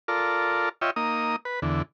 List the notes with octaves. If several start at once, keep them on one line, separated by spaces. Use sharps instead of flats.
F4 A4 A#4 D5
F4 C#5 D#5 E5 G5
A#3 D#4 D#6
B4
E2 D3